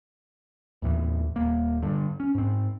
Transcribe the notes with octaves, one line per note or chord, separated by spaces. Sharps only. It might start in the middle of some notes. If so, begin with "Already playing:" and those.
D#2 A2 E3
D#1 A#3
G2 D3
C#4
G#2 C4